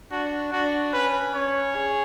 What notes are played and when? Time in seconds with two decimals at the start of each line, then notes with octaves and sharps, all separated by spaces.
0.11 D4 F#4
0.52 D4 F#4
0.93 C#4 B4
1.34 C#4 C#5
1.75 G#4